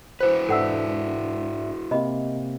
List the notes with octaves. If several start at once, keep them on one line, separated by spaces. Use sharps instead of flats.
E4 F#4 B4 C5
G#2 D4 A4 E5 F#5 E6
C3 A#3 C4 D#5 B5